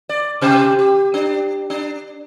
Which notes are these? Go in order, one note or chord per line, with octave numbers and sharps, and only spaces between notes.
D5
C3 G4 C5
G4
D4
D4